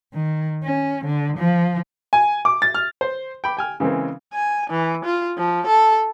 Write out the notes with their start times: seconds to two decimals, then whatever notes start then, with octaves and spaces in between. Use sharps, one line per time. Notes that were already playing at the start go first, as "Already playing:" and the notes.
0.14 D#3
0.64 C#4
1.05 D3
1.38 F3
2.13 G#5
2.45 D6
2.62 A6
2.75 F6
3.01 C5
3.44 G5 B5 D6
3.57 G5 G#5 F6
3.80 C#3 E3 G#3 A#3 C4
4.34 G#5
4.70 E3
5.05 F4
5.38 F3
5.67 A4